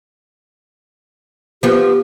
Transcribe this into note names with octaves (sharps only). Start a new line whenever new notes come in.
F3 B3 G4